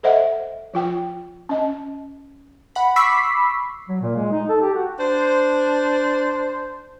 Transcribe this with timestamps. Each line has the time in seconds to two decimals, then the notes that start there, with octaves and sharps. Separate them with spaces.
0.03 A4 C5 D#5 E5 F#5
0.74 F3 F4 G5
1.49 C#4 D#5
2.75 F#5 B5
2.96 B5 C#6 D6 E6 B6 C7
3.89 F#3
4.01 A#2
4.16 G#3
4.32 D#4
4.49 A4
4.61 G4
4.75 F#4
4.99 D4 C5